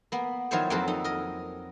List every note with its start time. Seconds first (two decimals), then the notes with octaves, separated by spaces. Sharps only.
0.12 A#3 B3
0.51 D#3 F3 F#3 E4 C5 C#5
0.70 F2 F#3 A#3 C4 A4 B4
0.88 D#4
1.04 A#4 D#5